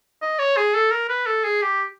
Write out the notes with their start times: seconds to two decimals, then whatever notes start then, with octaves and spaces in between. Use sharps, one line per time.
0.22 D#5
0.39 C#5
0.57 G#4
0.74 A4
0.91 A#4
1.09 B4
1.26 A4
1.44 G#4
1.62 G4